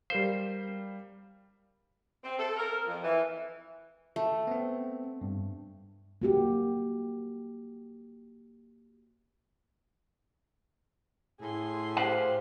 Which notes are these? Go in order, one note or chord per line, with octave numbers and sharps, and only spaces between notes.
G3 A#4 C5 F5
C4
A4
A#4
F2
E3
A3
B3 C4
G2
A#3 F#4 G4
A2 G#4 C6
G4 C5 F5 F#5